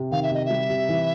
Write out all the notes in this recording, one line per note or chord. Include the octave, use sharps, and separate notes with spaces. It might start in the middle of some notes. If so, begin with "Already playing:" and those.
Already playing: C3
D#3 F5
E5
C3 D#5
G3 E5
C3
E3